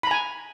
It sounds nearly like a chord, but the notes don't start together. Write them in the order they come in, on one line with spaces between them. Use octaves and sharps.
B5 A#5 G#5